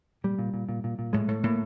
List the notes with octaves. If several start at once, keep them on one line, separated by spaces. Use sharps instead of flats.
A#2 G3
A#2
A#2
A#2
A#2
A#2
A2 G#3
A2 A3
A2 A#3